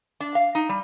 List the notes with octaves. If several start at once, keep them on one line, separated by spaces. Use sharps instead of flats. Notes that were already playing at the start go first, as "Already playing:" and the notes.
D4
F5
D#4
G3